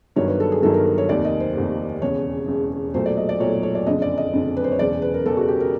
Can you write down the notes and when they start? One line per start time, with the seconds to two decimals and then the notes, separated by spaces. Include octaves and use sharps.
0.16 G1 G2 D#3 F#3 C#5
0.28 B4
0.40 A4
0.52 G#4
0.63 G1 G2 D#3 F#3 A4
0.74 A#4
0.86 A#4
0.98 C#5
1.09 F1 D#2 D#3 D5
1.25 D#5
1.40 C5
1.55 F1 D#2 D#3
2.01 E1 E2 C#3 C#5
2.47 E1 E2 C#3
2.94 B1 A#2 F#3 A3 C5
3.06 D5
3.17 D#5
3.29 D5
3.40 B1 A#2 F#3 A3 C#5
3.63 C#5
3.75 D5
3.86 F#1 F2 D3 D#5
4.02 D5
4.17 D#5
4.33 F#1 F2 D3
4.57 B4
4.64 C5
4.72 C#5
4.79 E1 E2 C#3 D5
5.02 B4
5.14 A#4
5.26 E1 E2 C#3 A4
5.37 F#4
5.48 G4
5.60 A#4